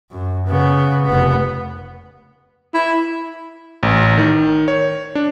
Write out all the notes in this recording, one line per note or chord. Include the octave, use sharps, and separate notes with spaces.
F#2
C#3 B3
F1 B3
E4
A1
D#3
C#5
D4